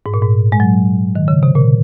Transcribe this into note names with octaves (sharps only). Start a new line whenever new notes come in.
G#2
A#2
G#2
G#3
F#3
D#3
C#3
C3
A#2